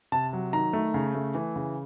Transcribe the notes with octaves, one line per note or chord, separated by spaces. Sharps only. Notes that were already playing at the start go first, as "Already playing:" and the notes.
C3 A5
F#3
D#3 A#5
A3
C#3
A3
E3
C#3